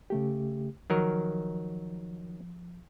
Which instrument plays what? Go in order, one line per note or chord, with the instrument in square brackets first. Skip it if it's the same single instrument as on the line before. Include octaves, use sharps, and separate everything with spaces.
[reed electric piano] C#3 A3 G4
[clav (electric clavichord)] D#3 F#3 A#4 [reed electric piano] F3